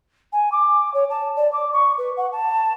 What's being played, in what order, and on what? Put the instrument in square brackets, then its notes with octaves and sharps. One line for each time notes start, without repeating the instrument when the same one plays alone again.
[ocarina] G#5
D6
C#5
A5
D5
D6
C#6
B4
F#5
A5